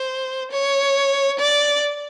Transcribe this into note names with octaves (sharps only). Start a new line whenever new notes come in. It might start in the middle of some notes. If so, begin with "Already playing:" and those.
Already playing: C5
C#5
D5